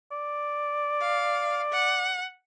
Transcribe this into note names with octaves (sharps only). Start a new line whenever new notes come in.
D5
F5
F#5